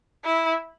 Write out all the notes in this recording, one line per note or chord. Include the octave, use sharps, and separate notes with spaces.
E4